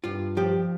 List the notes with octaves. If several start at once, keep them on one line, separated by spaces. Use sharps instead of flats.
G2 F4
F3 G4